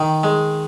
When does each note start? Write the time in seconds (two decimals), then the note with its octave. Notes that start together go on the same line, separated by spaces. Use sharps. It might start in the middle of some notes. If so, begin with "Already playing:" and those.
Already playing: D#3 D#4
0.24 G#3